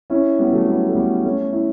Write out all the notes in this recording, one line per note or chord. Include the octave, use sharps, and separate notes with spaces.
C#4 E4
G3 B3
F#3 A3
G3 B3
A3
G3 B3
A3 C#4
C#4 E4